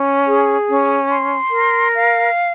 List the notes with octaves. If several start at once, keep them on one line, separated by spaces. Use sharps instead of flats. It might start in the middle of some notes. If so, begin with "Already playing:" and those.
Already playing: C#4
G#4
C#4
C6
A#4
F5